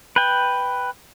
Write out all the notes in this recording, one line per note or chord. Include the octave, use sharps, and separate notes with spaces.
B4 G5